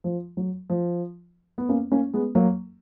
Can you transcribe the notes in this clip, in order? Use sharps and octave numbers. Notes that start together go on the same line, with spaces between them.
F3
F#3
F3
B3
A#3 C#4
A#3 C#4
G#3 B3
F#3 A#3